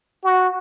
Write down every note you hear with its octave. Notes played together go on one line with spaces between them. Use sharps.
F#4